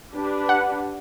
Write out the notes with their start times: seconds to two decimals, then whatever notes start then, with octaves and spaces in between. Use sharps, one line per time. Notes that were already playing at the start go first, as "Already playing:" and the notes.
0.15 D4 G4 B4
0.49 F#5